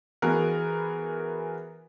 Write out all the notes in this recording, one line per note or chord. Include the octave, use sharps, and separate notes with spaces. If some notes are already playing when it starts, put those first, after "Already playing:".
E3 B3 F#4 G#4 A#4